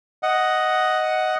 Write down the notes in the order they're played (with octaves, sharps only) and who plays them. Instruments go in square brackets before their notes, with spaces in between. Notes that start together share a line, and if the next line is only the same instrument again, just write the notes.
[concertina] D#5 F#5